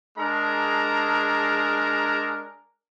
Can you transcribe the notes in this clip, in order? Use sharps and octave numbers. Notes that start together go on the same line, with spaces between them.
G#3 D4 G#4 A#4 A5 A#5